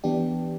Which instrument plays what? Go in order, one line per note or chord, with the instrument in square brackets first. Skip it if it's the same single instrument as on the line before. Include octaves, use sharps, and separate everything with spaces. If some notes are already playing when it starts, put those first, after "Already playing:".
[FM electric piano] E3 B3 D4 G4